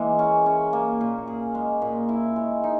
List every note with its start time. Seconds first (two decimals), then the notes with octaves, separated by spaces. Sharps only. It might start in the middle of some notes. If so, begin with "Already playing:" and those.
Already playing: C#3 E3 G#3 A#3
0.19 C#4
0.46 C#4
0.73 A#3
1.01 A#2
1.27 G#4
1.55 G#3
1.82 A#2
2.09 E4
2.36 G#3
2.64 D#4